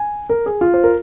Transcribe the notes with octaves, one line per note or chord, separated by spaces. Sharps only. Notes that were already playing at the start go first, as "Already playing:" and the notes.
Already playing: G#5
A#4
G#4
F4
C5
A#4